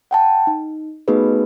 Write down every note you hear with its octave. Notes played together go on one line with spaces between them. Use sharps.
F#5 G5 A5
D#4
A3 B3 D#4 F#4 G#4 B4